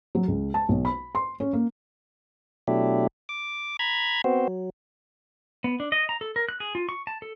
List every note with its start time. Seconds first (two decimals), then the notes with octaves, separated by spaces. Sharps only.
0.15 F#3
0.28 C#2
0.54 A5
0.69 B1
0.85 B5
1.15 C6
1.40 C#4
1.53 A#3
2.68 B2 F#3 A3 D4 E4 G4
3.29 D6
3.79 A#5 B5 G#6
4.24 B3 C4 F#4 C5
4.48 F#3
5.64 B3
5.80 D4
5.92 D#5
6.09 A#5
6.21 A4
6.36 A#4
6.49 F#6
6.60 G#4
6.75 F4
6.89 C#6
7.07 A5
7.22 A4